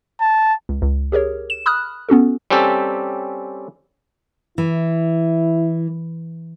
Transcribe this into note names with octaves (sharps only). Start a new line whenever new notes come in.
A5
C#2
C#2
G4 G#4 A#4 C#5
E7
B5 D#6 F6 F#6
B3 C#4 F#4 A4
G3 C4 C#4 G4 A4
E3 E4